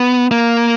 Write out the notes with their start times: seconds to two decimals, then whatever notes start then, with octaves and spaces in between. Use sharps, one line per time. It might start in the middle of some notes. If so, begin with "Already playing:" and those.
Already playing: B3
0.31 A#3